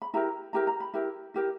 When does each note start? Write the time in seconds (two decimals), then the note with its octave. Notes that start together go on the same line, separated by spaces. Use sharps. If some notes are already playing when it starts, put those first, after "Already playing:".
0.02 B5
0.14 E4 G4 A#4 A#5
0.53 E4 G4 A#4 A#5
0.67 A#5
0.80 B5
0.94 E4 G4 A#4
1.34 E4 G4 A#4